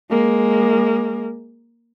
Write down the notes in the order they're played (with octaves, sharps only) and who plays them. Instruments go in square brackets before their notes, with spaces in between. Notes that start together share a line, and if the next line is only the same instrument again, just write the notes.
[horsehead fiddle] G#3 A#3